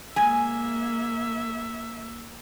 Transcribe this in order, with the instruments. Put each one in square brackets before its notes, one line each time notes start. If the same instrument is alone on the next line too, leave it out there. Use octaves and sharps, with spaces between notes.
[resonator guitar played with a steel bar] G#3 G#5 [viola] A#3 E5